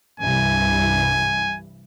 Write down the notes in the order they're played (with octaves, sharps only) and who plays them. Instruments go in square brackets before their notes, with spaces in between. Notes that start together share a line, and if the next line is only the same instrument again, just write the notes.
[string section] C2 G2 E3 [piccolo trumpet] G#5